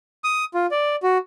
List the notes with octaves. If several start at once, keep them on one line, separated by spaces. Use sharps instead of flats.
D#6
F4
D5
F#4